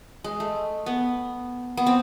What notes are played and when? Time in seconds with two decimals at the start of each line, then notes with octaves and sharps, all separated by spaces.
0.24 G#3
0.40 A3
0.86 B3
1.77 B3
1.87 C4